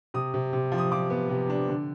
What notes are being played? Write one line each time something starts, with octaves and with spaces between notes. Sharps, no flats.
C3 D#6
C3
C3
F3
D#6
F3 D6
B3
C3
D4
D3